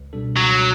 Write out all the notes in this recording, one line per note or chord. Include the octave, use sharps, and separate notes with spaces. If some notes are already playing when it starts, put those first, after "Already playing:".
Already playing: C#2
B2 G3 D4 A4
C#2 F#3
B2